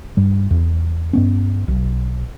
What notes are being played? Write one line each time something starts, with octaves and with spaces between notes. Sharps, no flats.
G2 G3
E2
G2 B3 C#4
B1